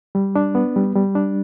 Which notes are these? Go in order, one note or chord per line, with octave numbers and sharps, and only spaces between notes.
G3
D4
B3
G3
G3
D4